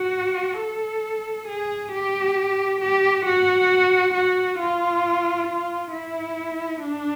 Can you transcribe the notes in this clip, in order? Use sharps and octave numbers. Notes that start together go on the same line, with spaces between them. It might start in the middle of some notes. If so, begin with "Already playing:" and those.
Already playing: F#4
A4
G#4
G4
G4
F#4
F#4
F4
F4
E4
D4